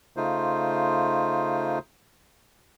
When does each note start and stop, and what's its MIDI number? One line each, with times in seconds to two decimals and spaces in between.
0.17 1.79 49
0.17 1.79 57
0.17 1.79 63
0.17 1.79 65
0.17 1.79 72